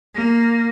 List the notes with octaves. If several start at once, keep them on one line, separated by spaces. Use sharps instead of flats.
A#3